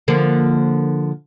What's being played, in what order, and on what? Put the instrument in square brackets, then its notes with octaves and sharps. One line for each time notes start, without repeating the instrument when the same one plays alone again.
[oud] D3 F3 A#3